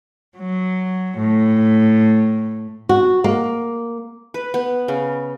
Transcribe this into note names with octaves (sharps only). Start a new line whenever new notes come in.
F#3
A2
F#4
A#3
B4
B3
C#3